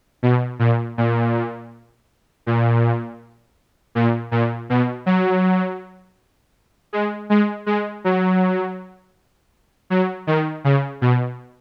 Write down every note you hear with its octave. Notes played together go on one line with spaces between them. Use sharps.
B2
A#2
A#2
A#2
A#2
A#2
B2
F#3
G#3
G#3
G#3
F#3
F#3
D#3
C#3
B2